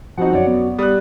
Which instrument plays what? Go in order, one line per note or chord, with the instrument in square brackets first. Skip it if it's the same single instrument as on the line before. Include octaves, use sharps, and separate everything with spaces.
[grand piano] F3 C4 D#4 [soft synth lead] F#4 [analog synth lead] F#5
[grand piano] F#2 C#5 D5
[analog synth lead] B3
[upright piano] G3 [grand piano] D#6 F#6